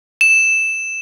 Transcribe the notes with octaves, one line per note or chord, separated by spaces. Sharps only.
E7